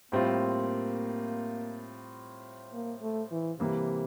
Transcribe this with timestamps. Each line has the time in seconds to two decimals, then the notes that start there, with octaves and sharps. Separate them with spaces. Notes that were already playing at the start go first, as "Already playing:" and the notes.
0.12 A2 G3 A#3 C4 F4
2.73 A#3
3.02 A3
3.32 E3
3.60 C3 E3 G3 A#3